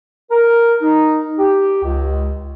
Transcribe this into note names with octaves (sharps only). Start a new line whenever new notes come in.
A#4
D#4
G4
C#2